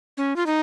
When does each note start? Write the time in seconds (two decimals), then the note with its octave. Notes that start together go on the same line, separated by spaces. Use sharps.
0.17 C#4
0.36 F4
0.46 D#4